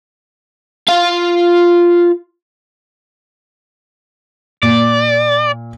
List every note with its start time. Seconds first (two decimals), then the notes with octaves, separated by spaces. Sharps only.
0.88 F4 F5
4.63 A#2 D5